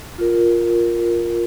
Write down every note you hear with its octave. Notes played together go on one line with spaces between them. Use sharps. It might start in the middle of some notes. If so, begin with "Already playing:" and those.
F4 A#4